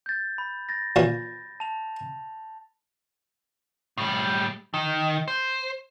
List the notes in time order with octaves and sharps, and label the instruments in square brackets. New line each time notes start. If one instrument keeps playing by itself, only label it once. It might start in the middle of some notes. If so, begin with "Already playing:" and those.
[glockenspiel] G6 A6
B5
A6 A#6
[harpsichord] A#2 E3
[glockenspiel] A5 F7
[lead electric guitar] A2 G3
D#3
C5